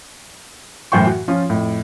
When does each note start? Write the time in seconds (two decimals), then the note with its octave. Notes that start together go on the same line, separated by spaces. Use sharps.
0.92 F#2 A2 E3 C5 G5 C#6
1.06 F#4
1.28 F3 C#4 F4
1.50 F2 A2